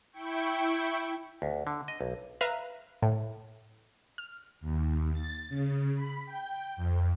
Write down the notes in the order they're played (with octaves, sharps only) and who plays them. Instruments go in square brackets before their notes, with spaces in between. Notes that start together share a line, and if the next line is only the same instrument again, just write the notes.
[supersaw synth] E4 G5 C#6
[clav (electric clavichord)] D2
D3
D#5
B1
[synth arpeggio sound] B4 E5 F5 A#5
A2
F6
[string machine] D#2
A6
C#3
B5
G5
F2